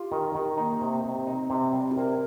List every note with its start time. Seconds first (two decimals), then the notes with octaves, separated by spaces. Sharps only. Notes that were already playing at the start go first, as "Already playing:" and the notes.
Already playing: F4 G4
0.12 D#3
0.35 D#3
0.58 A#3 D#4
0.81 C3
1.04 C3 C4
1.27 D#4
1.50 C3 C4
1.73 G3
1.91 G4
1.96 C3 A#4